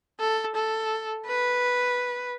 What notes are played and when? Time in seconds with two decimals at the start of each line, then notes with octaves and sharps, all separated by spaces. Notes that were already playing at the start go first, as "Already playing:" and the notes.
0.20 A4
0.56 A4
1.27 B4